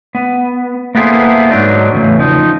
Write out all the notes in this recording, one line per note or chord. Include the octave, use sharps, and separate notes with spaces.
B3
A#3 B3 E4 G#4 A4 C5
G#2 F#3 G#3 D4 D#4
E2 A2 C#3
F3 D#4